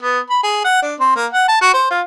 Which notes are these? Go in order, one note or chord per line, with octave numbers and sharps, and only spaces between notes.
B3
B5
G#4
F#5
D4
C4
A#3
F#5
A5
F#4
C5
F4